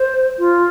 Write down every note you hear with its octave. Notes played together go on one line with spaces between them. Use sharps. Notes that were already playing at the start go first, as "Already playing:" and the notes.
Already playing: C5
F4